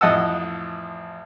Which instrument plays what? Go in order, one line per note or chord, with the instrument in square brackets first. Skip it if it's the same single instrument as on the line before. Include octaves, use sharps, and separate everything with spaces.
[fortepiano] A1 F2 D#5 F#5 A5 E6